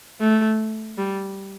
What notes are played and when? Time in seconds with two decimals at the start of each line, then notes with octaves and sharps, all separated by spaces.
0.21 A3
0.98 G3